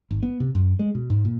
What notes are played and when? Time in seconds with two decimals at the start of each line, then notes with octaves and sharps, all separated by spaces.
0.11 G#1
0.23 B3
0.40 C3
0.55 F#2
0.79 G#3
0.95 B2
1.10 G#2
1.25 A#2